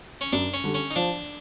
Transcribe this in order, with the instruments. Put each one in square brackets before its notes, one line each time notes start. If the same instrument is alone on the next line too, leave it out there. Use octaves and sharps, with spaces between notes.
[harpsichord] C#4
[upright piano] F#2 [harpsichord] D4
[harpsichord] C#4
[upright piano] D3 G3
[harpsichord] C#4
D#4
[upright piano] F3 [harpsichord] D4